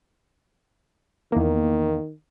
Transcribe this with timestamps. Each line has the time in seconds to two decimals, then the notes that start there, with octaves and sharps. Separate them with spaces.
1.32 E2 D#3 A#3